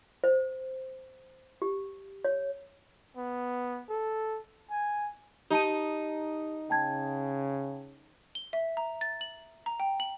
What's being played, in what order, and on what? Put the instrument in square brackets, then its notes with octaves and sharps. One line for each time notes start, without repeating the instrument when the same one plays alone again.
[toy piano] C5
G4
C#5
[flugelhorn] B3
A4
G#5
[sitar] D#4 [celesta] G4 A5 D#7
[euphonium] C#3 [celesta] G5 A5 G#6
[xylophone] G7
E5
A#5
A6
F#7
A#5
G5
F#7